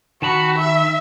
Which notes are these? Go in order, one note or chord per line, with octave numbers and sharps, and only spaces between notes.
D#3 F#4 A5 B5
E5